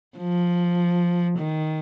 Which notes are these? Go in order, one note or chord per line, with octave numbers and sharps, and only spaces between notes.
F3
D#3